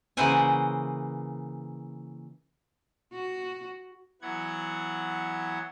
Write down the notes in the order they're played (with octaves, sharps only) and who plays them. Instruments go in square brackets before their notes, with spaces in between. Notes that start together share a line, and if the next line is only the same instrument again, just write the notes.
[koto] C#3 E3 A#3 C5 F#5 G#5
[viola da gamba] F#4
[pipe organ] E3 F#3 B3 F#5 G#6